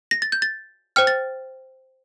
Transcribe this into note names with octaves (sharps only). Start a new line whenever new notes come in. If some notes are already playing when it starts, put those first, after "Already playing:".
A#6
A6
G6
A6
C5 G5 F6
A6